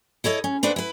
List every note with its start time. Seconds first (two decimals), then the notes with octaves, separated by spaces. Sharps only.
0.24 E4 A4 C#5 D#5
0.44 C#4
0.63 A3 B3 D4 B4 C5
0.76 E4 B4